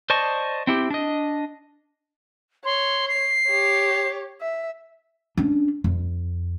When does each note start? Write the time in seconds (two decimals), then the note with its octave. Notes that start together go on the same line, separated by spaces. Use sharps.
0.10 C5 D5 D#5 A5 C#6
0.67 C4 E4 G4
0.90 D4 D#5
2.65 C#5 C6
3.08 C7
3.48 G4 C#5
4.41 E5
5.37 C#4 D4
5.84 F2